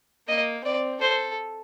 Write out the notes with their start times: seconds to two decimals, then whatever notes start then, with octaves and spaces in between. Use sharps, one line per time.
0.28 A#3 D#5
0.65 C4 D5
1.01 A4 C5